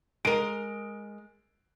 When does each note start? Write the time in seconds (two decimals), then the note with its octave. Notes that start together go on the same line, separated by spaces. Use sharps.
0.25 G#3 A#4 D7